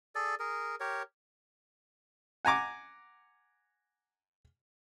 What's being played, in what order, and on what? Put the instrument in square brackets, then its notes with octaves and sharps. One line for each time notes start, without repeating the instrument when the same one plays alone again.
[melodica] G#4 A4 D5
G#4 A#4
G4 A#4 C#5
[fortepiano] F#5 G#5 A#5 D6